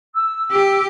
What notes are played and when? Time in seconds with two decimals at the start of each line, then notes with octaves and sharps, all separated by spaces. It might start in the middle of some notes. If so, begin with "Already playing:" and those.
0.14 E6
0.51 G4